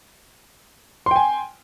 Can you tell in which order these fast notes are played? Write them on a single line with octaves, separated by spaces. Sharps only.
C6 G5 G#5